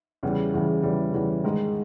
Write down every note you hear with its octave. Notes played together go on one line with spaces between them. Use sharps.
E2 C#3 E3 G3
E2 C#3 E3 G3
E2 C#3 E3 G3
E2 C#3 E3 G3
G#2 D#3 G#3